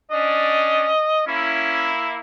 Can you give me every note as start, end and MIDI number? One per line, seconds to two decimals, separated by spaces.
0.11 0.89 61
0.11 0.89 62
0.11 0.89 74
0.11 1.26 75
1.27 2.19 58
1.27 1.88 61
1.27 2.19 64